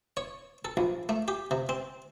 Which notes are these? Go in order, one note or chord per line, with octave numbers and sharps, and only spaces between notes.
C#5
A4
A#1
A3
G4
C3
C4